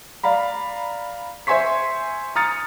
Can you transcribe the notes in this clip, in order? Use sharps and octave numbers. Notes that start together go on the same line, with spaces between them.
D5 F5 A#5 B5
C5 E5 G#5 C6 C#6 B6
A#5 D#6 F6 A6 C#7